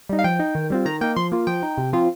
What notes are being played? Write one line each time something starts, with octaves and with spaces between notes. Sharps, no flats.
G3 D#4
F5
F3 G5
D#4
D#3
G3 C4 F4
D#3 A#5
A#3 D#4 G5
F3 C6
A#3 F4
F3 G5
D#4
C3
F3 C4 F4